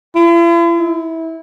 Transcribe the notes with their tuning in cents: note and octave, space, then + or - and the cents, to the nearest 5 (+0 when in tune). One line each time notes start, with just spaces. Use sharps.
E4 +45
E4 -20